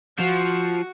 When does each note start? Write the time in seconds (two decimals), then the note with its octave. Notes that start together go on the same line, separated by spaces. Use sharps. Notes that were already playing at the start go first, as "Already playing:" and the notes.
0.19 F3 F#4